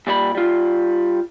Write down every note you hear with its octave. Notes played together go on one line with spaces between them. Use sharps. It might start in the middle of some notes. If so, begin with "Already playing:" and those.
A#2 G3 C#5 B5
G3 F4